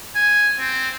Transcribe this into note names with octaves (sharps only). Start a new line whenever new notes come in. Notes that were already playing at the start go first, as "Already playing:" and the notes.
G#5
C4